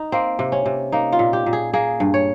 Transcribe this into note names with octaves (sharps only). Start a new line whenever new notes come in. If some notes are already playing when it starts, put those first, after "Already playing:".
Already playing: D#4
A#3 C4
C3
C#4
C3
A#3 D#4
F4
A#2
G4
A#2
G#4
A#3 G#4
G2
C#5